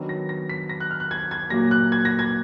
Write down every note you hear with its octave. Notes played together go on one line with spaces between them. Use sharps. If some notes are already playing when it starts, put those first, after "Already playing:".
Already playing: D#3 F#3 B3 D4
A#6
A#6
B6
A#6
F#6
F6
F#6
G#6
G#6
A#2 F#3 A#3 A#6
F#6
G#6
A#6
G#6